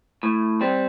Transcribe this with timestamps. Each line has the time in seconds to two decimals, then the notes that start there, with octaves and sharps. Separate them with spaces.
0.23 A2
0.61 G3 C4